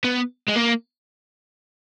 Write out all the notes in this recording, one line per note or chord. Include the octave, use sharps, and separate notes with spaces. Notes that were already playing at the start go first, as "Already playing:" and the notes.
B3
G#3
A#3